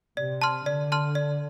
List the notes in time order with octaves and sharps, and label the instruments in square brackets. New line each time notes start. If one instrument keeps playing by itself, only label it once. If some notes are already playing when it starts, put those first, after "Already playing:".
[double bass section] C3 [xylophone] D5
[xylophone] A5 C6 F6
[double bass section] D3 [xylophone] D5
[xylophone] A5 C6 F6
D5